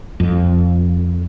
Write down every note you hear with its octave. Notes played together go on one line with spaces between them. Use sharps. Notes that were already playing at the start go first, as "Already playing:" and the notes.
F2